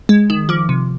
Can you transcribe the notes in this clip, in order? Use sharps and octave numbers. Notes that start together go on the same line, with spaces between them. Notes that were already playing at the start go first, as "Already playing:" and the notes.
G#3
D#3
F3 D6
C3